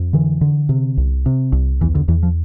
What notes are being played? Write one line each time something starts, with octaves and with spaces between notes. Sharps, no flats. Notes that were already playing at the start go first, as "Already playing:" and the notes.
Already playing: F2
D3 E3
D3
C3
C2
C3
C2
E2 E3
D3
E2 E3
F3